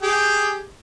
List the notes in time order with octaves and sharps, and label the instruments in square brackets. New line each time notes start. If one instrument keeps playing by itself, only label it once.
[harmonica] G4 G#4 G5